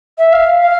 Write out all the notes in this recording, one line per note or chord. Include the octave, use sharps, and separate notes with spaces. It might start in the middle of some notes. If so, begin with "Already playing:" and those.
E5
F5
F5